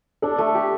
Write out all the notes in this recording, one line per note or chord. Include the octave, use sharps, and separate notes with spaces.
D4 A4
A3
G4